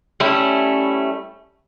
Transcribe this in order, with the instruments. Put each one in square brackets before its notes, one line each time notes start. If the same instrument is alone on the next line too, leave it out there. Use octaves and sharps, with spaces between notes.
[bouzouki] G3 A3 C#4 E4